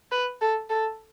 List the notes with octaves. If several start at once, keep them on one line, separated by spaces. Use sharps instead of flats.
B4
A4
A4